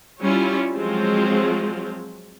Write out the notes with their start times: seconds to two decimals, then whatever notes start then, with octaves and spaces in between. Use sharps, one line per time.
0.21 G3 C#4 E4 F4 C#5
0.75 F3 F#3 G#3 C4 F4